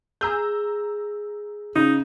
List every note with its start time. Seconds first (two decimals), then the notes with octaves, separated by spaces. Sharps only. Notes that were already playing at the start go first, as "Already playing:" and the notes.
0.21 G#4 A#5 E6 G6
1.76 C#3 D#4